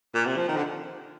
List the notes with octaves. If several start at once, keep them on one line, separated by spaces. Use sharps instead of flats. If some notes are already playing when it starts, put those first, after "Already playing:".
A#2
C3
F3
D#3
D3